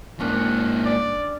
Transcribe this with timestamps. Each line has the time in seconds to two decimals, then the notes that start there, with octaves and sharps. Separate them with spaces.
0.20 G#2 A#3 C#4 D4
0.86 D5